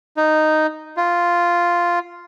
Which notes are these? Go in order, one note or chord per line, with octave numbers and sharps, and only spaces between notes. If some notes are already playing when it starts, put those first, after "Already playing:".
D#4
F4